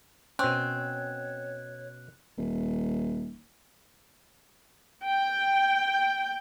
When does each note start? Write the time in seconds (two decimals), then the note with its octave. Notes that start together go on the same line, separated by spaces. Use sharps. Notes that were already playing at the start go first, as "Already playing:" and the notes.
0.39 B2 C4 C#4 C#5 F#6
2.38 D#1
5.06 G5